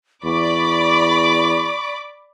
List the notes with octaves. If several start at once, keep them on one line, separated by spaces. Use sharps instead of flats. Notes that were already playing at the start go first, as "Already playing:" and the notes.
E2 D5 B5 C#6 D6